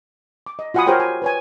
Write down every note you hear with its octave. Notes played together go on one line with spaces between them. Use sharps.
D6
D#5
F4 F#4 F#5 G#5 B5 D#6
G4 A#4 C5 C#5 F#5 G5
G#5
B4 C#5 G#5